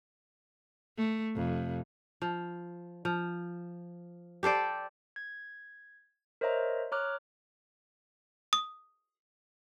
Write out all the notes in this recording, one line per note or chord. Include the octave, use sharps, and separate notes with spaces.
A3
F2 C3
F3
F3
G4 A4 C5 D5
G#6
A#4 C5 C#5 D#5 E5 A#5
C#5 A#5 D6 F6 F#6
D#6